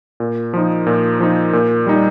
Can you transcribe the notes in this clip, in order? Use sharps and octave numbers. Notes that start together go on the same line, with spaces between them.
A#2
F3 D#4
A#2
F3 D#4
A#2
G3 D#4